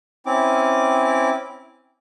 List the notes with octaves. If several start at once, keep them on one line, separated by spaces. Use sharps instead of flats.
C4 C#4 E4 D6